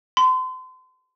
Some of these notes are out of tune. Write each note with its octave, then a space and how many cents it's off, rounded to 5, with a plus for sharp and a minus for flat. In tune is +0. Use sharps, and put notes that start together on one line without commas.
C6 -35